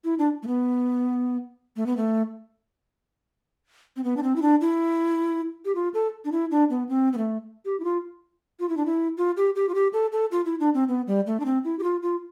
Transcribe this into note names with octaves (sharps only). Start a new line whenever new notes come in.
E4
D4
A3
B3
A3
B3
A3
C4
B3
D4
C4
E4
D4
E4
G4
F4
A4
D4
E4
D4
B3
C4
B3
A3
G4
E4
F4
F4
E4
D4
E4
F4
G4
G4
F4
G4
A4
A4
F4
E4
D4
C4
B3
G3
A3
D4
C4
E4
G4
F4
F4